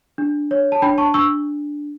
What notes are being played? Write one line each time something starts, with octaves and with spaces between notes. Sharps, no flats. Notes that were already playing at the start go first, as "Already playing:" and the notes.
D4
C#5
A5
D4 G5 B5
A5 C#6
D4 C#6 E6